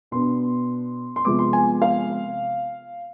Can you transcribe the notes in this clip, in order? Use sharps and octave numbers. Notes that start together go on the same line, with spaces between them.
B2 B3 D4 C6
C6
C3 F3 G#3 B3 D6
C6
G#5
F5